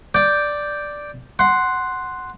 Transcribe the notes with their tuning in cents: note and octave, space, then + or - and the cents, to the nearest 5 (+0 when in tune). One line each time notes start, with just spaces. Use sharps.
D5 +0 G5 +0
F#5 +0 C6 +0